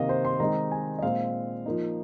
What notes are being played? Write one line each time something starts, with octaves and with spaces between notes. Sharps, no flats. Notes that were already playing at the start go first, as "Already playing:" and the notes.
Already playing: C3 D#3 A#3 D#5 F5
C5
C6
D#3 G#3 C4 D#4 A#5
G#5
D#5
A#2 G#3 C4 F5
F3 A#3 D#4